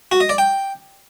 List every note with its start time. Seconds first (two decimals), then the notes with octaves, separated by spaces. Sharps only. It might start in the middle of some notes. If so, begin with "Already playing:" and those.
0.12 F#4
0.20 D#5
0.29 D5
0.38 G5